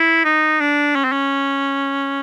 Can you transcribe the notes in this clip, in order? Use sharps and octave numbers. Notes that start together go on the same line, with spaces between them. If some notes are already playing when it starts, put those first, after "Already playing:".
Already playing: E4
D#4
D4
C#4
C4
C#4